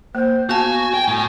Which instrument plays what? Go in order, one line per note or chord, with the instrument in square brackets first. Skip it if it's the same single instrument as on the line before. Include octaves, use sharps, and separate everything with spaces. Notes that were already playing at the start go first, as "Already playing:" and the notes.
[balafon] A#3 [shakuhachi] C5
[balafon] B3 F5 A5 [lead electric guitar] F#4 [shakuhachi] G#5
[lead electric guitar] G5
A2